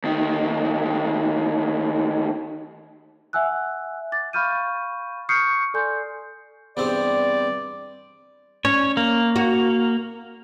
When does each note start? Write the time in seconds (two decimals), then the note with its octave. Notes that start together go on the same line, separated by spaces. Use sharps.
0.04 D2 D#3
3.33 E5 F#5 G#5 E6 F#6
4.12 D6 A6
4.33 F5 B5 C#6 F6 G6 D#7
5.29 C#6 D#6 F6 G6 C7 C#7
5.74 A4 D5 G#5 C6 G6
6.77 E2 G2 C4 D5
8.65 C#4 C#5
8.97 A#3
9.36 F#4